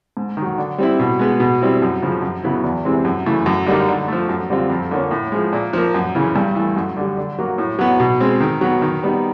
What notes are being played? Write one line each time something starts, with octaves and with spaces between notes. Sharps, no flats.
G#2
D#3
F#3
D3
G3 C4 E4
B2
G#3 B3
B2
G3 C4 E4
F#2
C#3 F3
F#2
C#3 F#3 B3 E4
E2
C3 E3 G#3 C4
F#2
C#3 E3 A3
F#2
D3 G3 A#3 D#4
D3
F3 A3
F#2
D3 G3 C4 F4
F2
D3 F3 A#3 C#4
A2
F3 G#3
A#2
F3 A#3
F#2
C#3 E3
G2
E3 A3
F#2
D3 G3
D3
F#3 A#3
A2
F#3 B3
B2
G#3 C4
D#3
F#3 B3
D#3
G3 B3 D#4